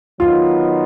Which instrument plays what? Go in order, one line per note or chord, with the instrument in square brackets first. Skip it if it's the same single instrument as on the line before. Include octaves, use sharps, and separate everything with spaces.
[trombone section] D#3 F#3 B3 D#4 [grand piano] F4